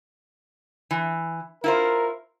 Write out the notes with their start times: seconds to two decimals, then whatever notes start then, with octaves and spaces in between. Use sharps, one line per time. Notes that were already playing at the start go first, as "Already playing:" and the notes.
0.91 E3
1.64 E4 F4 A#4 C5